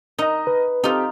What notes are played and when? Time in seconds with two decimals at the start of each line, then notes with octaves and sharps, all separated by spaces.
0.18 D#4 A#4 D#5
0.47 B4
0.84 C4 D#4 F4 G4 A4